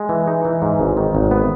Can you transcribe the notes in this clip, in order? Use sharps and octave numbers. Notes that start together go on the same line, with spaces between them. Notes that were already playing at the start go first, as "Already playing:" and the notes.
Already playing: G#3
E3
D#4
E3
G#2
G#1
D#3
G#1
B3